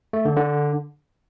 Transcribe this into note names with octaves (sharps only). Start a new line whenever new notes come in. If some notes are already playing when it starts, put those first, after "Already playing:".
A3
D3
D3